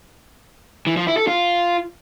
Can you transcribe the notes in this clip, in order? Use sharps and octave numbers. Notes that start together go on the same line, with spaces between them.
E3
F3
E4
A4
F4